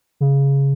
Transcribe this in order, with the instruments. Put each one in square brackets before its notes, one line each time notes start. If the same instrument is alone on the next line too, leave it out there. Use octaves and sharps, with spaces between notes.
[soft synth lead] C#3